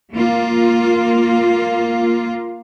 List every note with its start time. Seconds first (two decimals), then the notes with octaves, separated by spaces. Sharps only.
0.15 A#3 F4